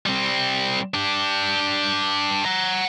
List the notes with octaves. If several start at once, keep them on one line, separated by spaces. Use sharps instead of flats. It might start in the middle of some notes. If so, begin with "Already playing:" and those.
G3 C4
D4 G4
F#5 A#5